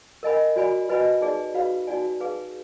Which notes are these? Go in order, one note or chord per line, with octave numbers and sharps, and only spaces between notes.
A#4 D#5 G#5 B5
F#4 D5 G#5 B5
F#4 B4 D#5 G#5 B5
D#4 G#4 D5
F#4 B4 F5 B5
D#4 F#4 D5 G#5
D#4 G#4 B4 F5